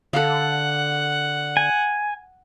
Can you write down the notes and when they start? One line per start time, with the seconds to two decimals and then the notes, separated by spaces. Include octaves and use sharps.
0.13 D3 A4 F5 F#5
1.57 G#5